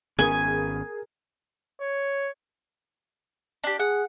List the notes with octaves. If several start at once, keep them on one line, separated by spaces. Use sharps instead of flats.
G#1 B3 C#4 G#4 A#4 G#5 D#6
C#5
D4 G4
G#4 F#5